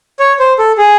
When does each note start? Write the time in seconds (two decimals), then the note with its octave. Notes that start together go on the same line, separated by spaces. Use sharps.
0.19 C#5
0.39 C5
0.59 A4
0.78 G#4